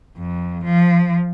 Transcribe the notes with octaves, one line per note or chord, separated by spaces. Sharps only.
F2
F3